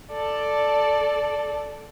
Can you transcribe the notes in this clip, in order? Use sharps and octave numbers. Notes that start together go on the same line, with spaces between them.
A4 D5